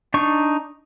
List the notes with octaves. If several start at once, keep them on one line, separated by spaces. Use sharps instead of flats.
D4 D#4 C#6